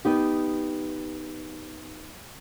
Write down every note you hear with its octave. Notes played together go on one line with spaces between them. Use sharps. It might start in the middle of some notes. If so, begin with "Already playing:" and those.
B3 D#4 G4